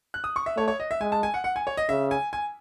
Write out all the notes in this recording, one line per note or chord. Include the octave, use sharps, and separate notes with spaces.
F#6
D#6
C#6
E5
A3 C#5
C#5
D#5
E5
G#3 G#5
A5
G#5
F#5
F#5
G#5
C#5
D#5
C#3 E5
G#5
G#5